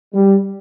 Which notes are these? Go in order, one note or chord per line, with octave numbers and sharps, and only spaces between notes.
G3